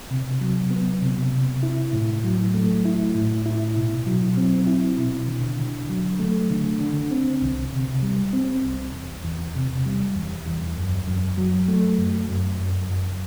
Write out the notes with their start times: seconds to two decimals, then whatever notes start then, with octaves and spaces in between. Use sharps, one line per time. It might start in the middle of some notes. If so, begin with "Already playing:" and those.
0.11 C3
0.41 F#3
0.71 B3
1.02 C3
1.32 C3
1.63 E4
1.93 A2
2.24 F#3
2.54 A3
2.85 E4
3.15 A2
3.46 E4
3.76 B2
4.06 F#3
4.37 C4
4.67 E4
4.98 B2
5.28 D3
5.59 D3
5.90 F#3
6.19 A3
6.50 D3
6.81 D3
7.11 C4
7.42 C2
7.72 C3
8.02 G3
8.33 C4
8.64 C2
8.94 E2
9.25 E2
9.55 C3
9.86 G3
10.16 E2
10.46 E2
10.77 F#2
11.07 F#2
11.38 F#3
11.68 A3
11.99 F#2
12.29 F#2
12.60 F#2
12.90 F#2